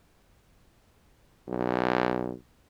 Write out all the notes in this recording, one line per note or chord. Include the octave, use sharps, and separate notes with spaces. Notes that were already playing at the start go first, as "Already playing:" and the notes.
B1